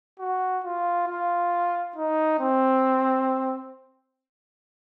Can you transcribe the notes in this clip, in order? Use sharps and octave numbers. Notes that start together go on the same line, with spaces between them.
F#4
F4
F4
D#4
C4